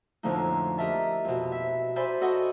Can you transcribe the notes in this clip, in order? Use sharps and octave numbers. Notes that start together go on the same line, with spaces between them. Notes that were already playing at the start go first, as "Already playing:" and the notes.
F2 A2 D3 F3 A#3 D#4
G4 A#4 D#5 E5 A5
F2 B2
E5
C5 D5 E5 G#5 B5 C6
F#4 A4 D#5 F#5 C#6